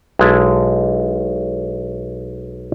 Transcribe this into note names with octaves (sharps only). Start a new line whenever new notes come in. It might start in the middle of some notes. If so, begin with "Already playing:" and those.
B1 G#3 E4 A5